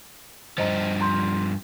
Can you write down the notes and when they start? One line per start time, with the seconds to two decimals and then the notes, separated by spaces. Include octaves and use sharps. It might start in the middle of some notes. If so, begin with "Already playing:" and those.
0.58 G2 F3 C5 D#5 A#5
1.01 A#5 C6 G6